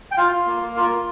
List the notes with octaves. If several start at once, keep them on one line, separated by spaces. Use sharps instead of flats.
G5
F4 F5
F4
A#3
A#3
F4 A#4
F4